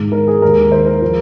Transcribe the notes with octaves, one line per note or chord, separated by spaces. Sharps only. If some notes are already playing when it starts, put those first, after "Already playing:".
Already playing: G#2 D#3 G#3
A#4
G#4
D#2 D#3 G#3 A#4
C5
A#4
F3 G#3